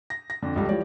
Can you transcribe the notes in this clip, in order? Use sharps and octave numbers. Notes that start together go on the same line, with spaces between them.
A#6
A#6
F2 D3
C#2 F3 G3 A4
E3 F3 G3 G4 C#5 D5